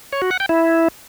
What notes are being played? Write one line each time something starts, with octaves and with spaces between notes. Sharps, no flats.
C#5
F#4
F#5
G5
E4